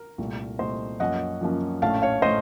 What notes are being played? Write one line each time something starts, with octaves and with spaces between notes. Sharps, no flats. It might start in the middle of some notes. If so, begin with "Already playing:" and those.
Already playing: A#4
C2 A#2 A3
C2 A#2 A3 C5 D#5
F#2 F3 A#3 C#4 D#5 F#5
F#2 F3 A#3 C#4
A#1 A2 A3 C#4 F5 A5
C#5 F5
A2 A3 C5 D#5